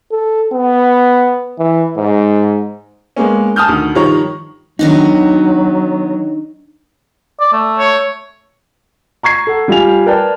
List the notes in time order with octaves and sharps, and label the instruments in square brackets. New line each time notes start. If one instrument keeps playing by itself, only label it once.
[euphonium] A4
B3
E3
G#2
[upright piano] G#3 A#3 B3 C#4
G#5 A5 D#6 F6 G6
D2 D#3
G2 D#3 F3 C#5 A#5
[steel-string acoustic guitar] D#3 B3 F#4 [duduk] F#3 [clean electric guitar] D4 D#4
[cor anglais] D5
A3
[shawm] C#5
[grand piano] A#5 C#6 G#6 C7
A4 F#5
G3 F4 G#5 F7
A#4 B4 D5 G5 A5